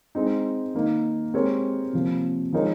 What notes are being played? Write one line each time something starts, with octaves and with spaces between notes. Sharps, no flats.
G#3 C4 D#4
D#3 A#3 D#4
G#3 C4 G4 A#4 C#5
C3 F3 A#3
F3 G#3 D#4 A#4 C#5